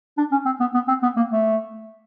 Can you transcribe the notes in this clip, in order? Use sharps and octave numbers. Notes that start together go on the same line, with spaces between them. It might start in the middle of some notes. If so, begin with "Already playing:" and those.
D4
C#4
C4
B3
B3
C4
B3
A#3
A3